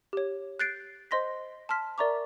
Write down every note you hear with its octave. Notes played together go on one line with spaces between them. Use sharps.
G4 C#5
F#6 G6 A6 C7 D7
C5 D#5 C6 A#6 B6
A5 C6 F6 B6
A#4 D5 E5 A#5 C#6 D6